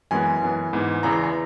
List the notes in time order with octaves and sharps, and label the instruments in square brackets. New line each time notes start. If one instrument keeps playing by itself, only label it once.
[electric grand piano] F#2 E3 G#3 B3 G#5
F#2 E3 B3
G#2 E3 B3
E2 C#3 E3 A#5